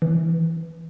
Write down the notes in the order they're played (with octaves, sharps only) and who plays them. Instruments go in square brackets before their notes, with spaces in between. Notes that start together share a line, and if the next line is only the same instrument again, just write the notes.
[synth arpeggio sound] E3